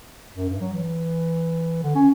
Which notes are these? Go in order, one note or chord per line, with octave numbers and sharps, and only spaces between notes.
F#2
G2
F#3
E3
D3
C#4